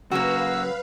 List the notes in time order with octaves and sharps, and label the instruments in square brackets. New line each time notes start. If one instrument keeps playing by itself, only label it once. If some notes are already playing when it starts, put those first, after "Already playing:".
[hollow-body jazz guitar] C#3 F#3 C#4 [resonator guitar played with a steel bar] A#3 F#4 [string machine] B4 F5 [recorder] E6